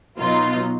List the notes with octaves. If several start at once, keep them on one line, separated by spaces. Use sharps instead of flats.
B2 F#3 B3 D#4 F4